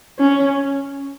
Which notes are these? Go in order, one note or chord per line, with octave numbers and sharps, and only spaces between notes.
C#4